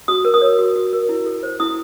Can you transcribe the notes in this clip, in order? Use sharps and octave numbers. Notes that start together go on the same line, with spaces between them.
F#4 D#6
A#4
D#6
C#5
F#4
F#4
A#4
E4
A4
C5
E4 D#6